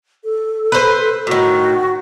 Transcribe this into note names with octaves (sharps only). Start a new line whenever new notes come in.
A4
B4 C5
A2 D#3 F#4